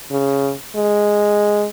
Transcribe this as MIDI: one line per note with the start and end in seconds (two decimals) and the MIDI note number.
0.11 0.53 49
0.76 1.66 56